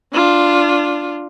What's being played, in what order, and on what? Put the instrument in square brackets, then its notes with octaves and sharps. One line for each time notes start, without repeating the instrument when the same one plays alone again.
[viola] D4 F4